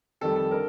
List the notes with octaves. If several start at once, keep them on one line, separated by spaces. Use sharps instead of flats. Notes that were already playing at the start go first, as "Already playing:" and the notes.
F2 D#3 G3 A4
A4
D3 A#4